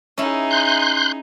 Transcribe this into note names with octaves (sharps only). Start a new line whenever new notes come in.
C#4 D#4 E4 G#4
C6 F#6 G6